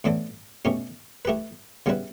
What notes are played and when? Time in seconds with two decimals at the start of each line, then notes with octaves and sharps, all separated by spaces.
0.04 A2 E3 B3 D4 A4
0.65 B2 A3 C#4 G4
1.25 A3 E4 G4 B4
1.86 C#3 G3 B3 E4 B4